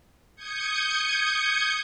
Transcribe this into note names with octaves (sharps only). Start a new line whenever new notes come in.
D#6 G6 G#6 C#7